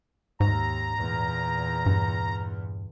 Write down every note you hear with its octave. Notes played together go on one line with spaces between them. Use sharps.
D#2 G#2 A#5
E2 A#2
G2